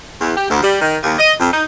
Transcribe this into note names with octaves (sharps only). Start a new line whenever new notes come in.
E2
G4
D2
G3
D#3
D#2
D#5
F2
D#4